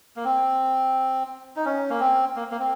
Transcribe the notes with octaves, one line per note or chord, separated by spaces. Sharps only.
A#3
C4
D#4
C#4
A#3
C4
A#3
A#3
C4